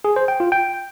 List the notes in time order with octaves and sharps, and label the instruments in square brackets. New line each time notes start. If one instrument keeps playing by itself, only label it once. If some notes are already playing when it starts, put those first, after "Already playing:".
[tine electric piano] G#4
C5
G5
F4
G5